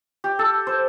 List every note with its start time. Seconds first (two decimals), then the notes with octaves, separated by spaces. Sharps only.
0.24 G4
0.39 A4
0.67 C5